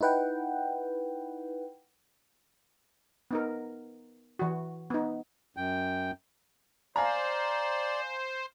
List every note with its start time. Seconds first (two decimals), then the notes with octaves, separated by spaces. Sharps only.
0.01 D#4 E4 B4 F#5 G5
3.31 B3 D#4 A#4
4.39 E3 F#4
4.90 B3 D#4
5.57 F#2 G5
6.96 C5 D5 F5 G#5 A#5